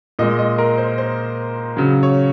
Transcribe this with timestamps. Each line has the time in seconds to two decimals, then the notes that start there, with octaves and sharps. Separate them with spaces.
0.19 A#2 G#3 D#5
0.39 D#5
0.58 A#4
0.78 C5
0.98 C5
1.77 C#3 F#3
2.03 C#5